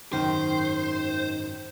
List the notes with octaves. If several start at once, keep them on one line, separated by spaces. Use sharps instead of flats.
G#1 F#2 D#3 C5